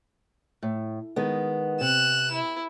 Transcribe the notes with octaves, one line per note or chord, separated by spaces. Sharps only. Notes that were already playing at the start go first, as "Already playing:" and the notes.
A2
D#3 G#3 B3
C3 F#6 E7
E4